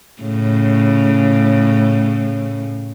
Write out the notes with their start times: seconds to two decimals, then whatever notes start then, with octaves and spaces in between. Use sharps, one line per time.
0.22 A2 C#3